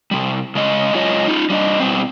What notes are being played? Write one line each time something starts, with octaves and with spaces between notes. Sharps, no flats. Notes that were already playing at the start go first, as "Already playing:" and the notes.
C3 G3
C#3 G#3 D#5
F#2 G#3 F4 C#5 D#5
D#4 F4
G3 D4 D#5
B2 G3 B3 C4